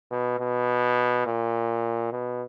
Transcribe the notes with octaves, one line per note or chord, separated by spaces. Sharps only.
B2
B2
A#2
B2